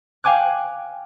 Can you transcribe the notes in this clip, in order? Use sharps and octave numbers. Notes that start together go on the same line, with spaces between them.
F5 G5 G#5 D6 F#6